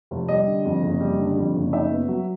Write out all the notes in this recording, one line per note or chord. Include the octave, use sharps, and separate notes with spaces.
F1
G3 D#5
D3
F2
F#1
G3
D3
F2
F#1
D#4 E5
B3
F#3